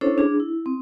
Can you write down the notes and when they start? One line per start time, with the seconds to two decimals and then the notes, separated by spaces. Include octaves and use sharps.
0.01 C#4 D4 E4 A4 C5 C#5
0.18 D4 G#4
0.40 E4
0.66 C4